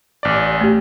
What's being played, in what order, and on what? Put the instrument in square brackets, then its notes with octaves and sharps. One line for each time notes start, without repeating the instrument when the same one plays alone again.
[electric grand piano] A1 D5
[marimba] A3 G4